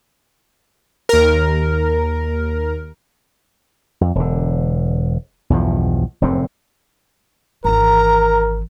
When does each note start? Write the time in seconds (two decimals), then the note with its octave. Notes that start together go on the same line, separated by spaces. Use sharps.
1.09 D#2 A#4
4.01 F2
4.15 E1 D3
5.50 B1 E2 G2 F3
6.22 F1 F#2 A2 C4
7.65 G#1 E3 A#4 A#5